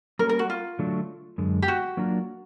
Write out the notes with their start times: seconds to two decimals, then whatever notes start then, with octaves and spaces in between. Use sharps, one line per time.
0.19 G3 A#3 C#4 A#4
0.29 A#4
0.39 F#4
0.50 F4
0.79 D3 F#3 A3 D4 F#4
1.38 F#2 D3 G#3
1.62 G4
1.68 F#4
1.97 F#3 A#3 D4 F4 A#4